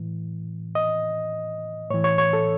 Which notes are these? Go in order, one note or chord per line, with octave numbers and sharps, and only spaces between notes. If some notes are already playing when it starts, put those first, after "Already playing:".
Already playing: A2 E3
D#5
A2 E3 C#5
C#5
C#5
A4